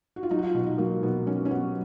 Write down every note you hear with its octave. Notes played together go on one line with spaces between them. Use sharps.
F#4
F4
F#3 D#4
F#4
F4
B2
D#4
F#3 A#3
B2 B3
F#3 C#4
C#4
F#3 B3